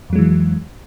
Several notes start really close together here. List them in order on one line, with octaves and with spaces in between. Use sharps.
F2 F#3 G#3 E3